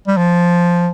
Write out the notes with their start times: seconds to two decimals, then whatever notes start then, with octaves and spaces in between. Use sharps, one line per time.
0.07 G3
0.17 F3